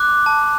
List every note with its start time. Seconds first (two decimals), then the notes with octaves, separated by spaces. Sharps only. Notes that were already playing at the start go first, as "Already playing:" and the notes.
Already playing: D6 F#6
0.26 A5